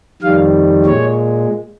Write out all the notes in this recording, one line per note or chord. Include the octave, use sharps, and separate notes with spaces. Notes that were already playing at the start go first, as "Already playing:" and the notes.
F2 D#3 G3 F5
A#2 G#3 C#5